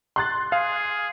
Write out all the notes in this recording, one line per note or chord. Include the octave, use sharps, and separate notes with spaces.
C6 F#6 A6
G#4 F5